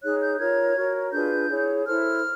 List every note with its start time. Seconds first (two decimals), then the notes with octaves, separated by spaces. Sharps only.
0.02 D#4 G#4 C#5 F#6
0.21 G6
0.40 F4 A#4 C#5 G#6
0.76 F#4 A#4 C#5
1.13 D4 F4 G#4 B4 G6
1.50 E4 G#4 C#5
1.86 E4 A4 C5 F6